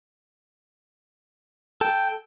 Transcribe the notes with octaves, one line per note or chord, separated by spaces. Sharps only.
A4 G5